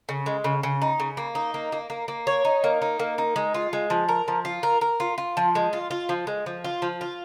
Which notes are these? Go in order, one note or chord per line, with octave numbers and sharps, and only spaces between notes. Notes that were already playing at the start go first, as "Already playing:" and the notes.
C#3
G#3
C#3
C#3
D#4
C#3
A#3
D#4
A#3
A#3
A#3
A#3
C#5
D#4
A#3
D#4
A#3
D#4
G#3
F4
G#3
F3
A#4
F3
F4
A#4
A#4
F4
F4
F3
G#3
F4
F4
F3
G#3
F3
F4
F3
F4